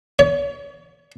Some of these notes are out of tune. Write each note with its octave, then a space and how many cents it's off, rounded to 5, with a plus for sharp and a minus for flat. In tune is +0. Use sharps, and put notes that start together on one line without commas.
C#5 +40